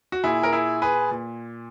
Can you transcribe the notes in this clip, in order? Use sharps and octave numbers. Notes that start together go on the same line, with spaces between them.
F#4
A#2 E4 G#4
A#4
E4 G#4
G#4 B4
A#2